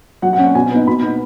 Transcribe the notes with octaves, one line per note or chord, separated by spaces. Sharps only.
F#3 F#5
F#5
C#4
F#5
B2 G#5
B3 D#4
B2 B5
B3 D#4